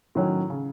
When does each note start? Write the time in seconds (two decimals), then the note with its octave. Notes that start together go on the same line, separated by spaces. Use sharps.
0.15 A2 D#3 F#3 C#4
0.50 C#3